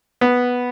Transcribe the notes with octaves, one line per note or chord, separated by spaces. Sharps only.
B3